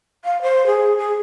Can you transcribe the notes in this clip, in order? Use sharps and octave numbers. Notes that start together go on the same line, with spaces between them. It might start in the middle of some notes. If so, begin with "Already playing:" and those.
F5
C5
G#4
G#4